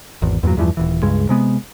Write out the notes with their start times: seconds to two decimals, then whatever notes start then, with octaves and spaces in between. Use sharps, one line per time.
0.22 G#1 E2
0.43 E2 G2 A#2 F#3
0.57 E2 G2 E3 F3
0.77 D#1 E3
1.03 C#2 G2 G#3
1.29 C3 G#3 B3